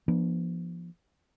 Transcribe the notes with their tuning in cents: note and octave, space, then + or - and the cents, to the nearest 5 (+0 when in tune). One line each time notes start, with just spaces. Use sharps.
F3 -25 B3 -45 D4 +20